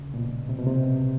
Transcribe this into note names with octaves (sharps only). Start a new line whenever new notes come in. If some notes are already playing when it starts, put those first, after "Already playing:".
Already playing: C#3
A#2
B2
C3
B2
C3